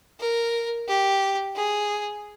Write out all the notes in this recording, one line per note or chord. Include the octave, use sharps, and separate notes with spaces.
A#4
G4
G#4